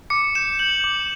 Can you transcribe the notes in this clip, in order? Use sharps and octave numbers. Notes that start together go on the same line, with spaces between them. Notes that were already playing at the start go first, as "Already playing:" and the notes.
D6 C#7
G6 E7
G6 F#7
D6